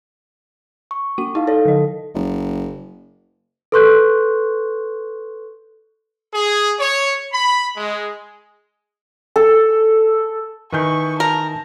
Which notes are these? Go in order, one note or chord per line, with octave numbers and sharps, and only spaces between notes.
C#6
A#3 F#4 D#7
D#4 E4 F5
A4 C#5 D5
D3 D#5
F#1
A4 B4 C6 C#6 F#6 G6
G#4
C#5
B5
G#3
A4
D#3 E3 B4 G#5 C#6 G6
A#4 A5